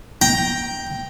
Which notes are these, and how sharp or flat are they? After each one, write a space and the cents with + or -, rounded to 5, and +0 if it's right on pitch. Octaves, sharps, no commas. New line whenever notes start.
G5 +0 A#5 +10